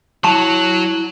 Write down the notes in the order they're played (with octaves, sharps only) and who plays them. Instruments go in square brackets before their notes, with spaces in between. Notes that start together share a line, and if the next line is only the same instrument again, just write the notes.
[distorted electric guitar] F#3 [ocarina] E4 [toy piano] A5 C#6